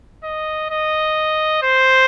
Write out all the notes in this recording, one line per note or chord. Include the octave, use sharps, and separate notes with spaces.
D#5
D#5
C5